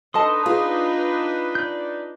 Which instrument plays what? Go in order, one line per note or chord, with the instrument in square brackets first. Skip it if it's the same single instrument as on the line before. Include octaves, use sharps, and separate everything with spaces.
[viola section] D4 D#4 B4 [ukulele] A4 D#5 A5 [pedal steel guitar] C6 D#6
[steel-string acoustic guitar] F4 [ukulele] G#4
[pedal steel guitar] D5 G6